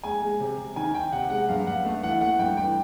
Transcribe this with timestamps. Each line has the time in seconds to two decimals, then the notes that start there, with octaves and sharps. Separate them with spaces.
0.03 G#3 G#5
0.22 G#3
0.40 C3
0.57 C3
0.76 D#3 G#5
0.94 D#3 G5
1.12 C3 F#5
1.30 G#3 F#5
1.49 G2 F5
1.66 G2 F#5
1.84 A3 F5
2.03 E3 F#5
2.21 A3 F#5
2.39 G2 G5
2.57 E3 G5